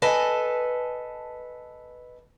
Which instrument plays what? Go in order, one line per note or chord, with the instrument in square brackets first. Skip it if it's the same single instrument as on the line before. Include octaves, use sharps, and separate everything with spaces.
[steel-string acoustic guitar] A4 B4 D#5 G#5 A5